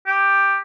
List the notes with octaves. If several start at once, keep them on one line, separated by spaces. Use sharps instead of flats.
G4